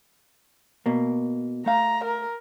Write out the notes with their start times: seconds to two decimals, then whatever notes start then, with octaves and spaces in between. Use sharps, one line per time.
0.86 B2 A#3
1.66 A3 F5 A#5
2.04 A#4